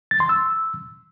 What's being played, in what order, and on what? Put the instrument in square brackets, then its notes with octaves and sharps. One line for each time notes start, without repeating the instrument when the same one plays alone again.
[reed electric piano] A6
C6
E6